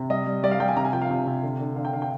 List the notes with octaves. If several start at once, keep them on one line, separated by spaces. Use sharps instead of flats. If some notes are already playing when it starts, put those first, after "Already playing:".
Already playing: C3
G3 D#5
G3
G3 D5
F5
G3 G5
G#5
C3 A#5
G#5
F3 G5
F5
C3
C3
D3
D3
D3 F5
G5
D3 F5
G5